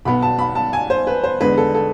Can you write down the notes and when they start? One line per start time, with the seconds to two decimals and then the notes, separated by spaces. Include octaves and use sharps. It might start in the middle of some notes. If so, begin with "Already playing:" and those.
0.05 B1 B2 B3 B5
0.22 A5
0.39 B5
0.55 A5
0.73 G#5
0.90 C5
1.07 B4
1.24 C5
1.41 E2 D3 G#3 B4
1.58 A4
1.75 A4